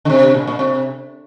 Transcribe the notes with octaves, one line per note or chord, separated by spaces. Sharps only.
D3
C3
A#2
A#2
C3